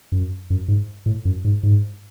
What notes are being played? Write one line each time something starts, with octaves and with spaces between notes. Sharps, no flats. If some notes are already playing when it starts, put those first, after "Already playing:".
F#2
F#2
G#2
A2
F#2
G#2
G#2